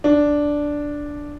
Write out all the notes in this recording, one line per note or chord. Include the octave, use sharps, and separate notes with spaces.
D4